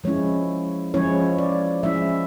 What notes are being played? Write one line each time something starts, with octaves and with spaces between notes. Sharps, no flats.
F3 G#3 C#4 E4 C#5
F3 G#3 C#4 E4 C#5
D5
F3 G#3 C#4 E4 E5